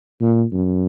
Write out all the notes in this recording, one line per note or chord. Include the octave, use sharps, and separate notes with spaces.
A#2
F#2